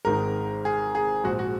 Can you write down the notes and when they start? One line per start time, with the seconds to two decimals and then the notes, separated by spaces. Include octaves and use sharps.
0.05 G#1 G#2 D#3 A#4
0.65 G#4
0.95 G#4
1.24 A#1 G#2 F3 F#4
1.39 F#4